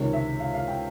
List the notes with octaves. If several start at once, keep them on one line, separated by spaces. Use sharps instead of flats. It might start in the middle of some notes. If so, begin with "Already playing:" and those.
Already playing: C#2 C3 D#3 C#5
E5
F5
F5
G5